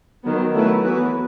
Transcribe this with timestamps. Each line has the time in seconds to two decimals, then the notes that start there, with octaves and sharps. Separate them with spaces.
0.25 D#3 F#3 B3
0.54 F#3 A3 E4 B4
0.83 E3 B3 F#4 B4